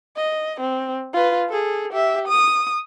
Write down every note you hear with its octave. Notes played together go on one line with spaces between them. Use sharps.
D#5
C4
F4 B4
G#4 A4
G4 E5
D#6